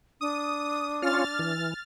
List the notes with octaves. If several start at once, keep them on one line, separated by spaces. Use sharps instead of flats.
D4 D#6
C#4 F4 F6 A6
E3